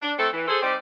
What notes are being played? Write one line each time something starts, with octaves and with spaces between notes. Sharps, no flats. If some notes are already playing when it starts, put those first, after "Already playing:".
D4
A3 C4 E4 A4
E3
G#4 A4 C5
G3 C4 D#4 G4 C5 D5